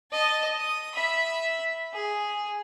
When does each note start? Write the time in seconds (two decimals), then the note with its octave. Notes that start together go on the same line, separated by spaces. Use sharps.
0.12 D#5 A5
0.57 D#6
0.94 E5 B5
1.94 G#4